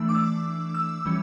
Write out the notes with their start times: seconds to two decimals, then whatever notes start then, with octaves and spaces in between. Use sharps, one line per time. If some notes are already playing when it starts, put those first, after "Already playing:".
Already playing: E3 A3 D4 E6
0.09 D6
0.15 E6
0.74 E6
1.05 E3 G3 C#4